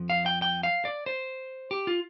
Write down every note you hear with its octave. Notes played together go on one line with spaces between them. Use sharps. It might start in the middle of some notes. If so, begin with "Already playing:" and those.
Already playing: F2 F3
F5
G5
G5
F5
D5
C5
G4
F4